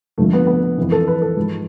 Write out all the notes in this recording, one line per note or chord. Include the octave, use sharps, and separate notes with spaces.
F2 D3 F3 A3
B3
B3
F2 E3
A4
B4
A4
G#2 F3